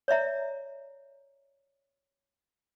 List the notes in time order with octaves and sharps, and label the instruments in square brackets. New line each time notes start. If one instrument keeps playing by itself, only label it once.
[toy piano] C#5 D5 E5 A#5